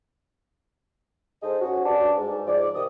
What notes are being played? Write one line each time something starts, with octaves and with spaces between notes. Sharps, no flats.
G#2 G#4 A4 C5 D#5
C#4 F#4
G2 D4 D5 A5
G#2
F3 G#3 D5
C3 D#3 D#6